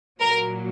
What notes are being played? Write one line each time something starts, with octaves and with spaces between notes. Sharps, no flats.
A#2 F#3 A#4